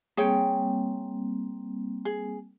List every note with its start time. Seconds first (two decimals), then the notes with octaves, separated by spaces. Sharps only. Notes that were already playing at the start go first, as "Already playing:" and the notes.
0.17 G3 A#3 C4 G#4 C#5 G5
2.05 G#4